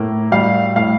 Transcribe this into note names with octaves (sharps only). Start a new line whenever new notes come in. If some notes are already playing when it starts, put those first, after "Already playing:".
Already playing: A2 A#3
G3 F5
A2 F5